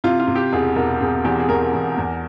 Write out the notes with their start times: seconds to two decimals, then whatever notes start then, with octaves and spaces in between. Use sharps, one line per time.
0.04 C3 F4
0.19 F4
0.27 C3
0.35 G4
0.53 E1 G#4
0.76 E1 A#4
1.01 C3 G#4
1.24 E2 G4
1.39 G#4
1.49 E2 A#4
1.73 E2
1.97 E2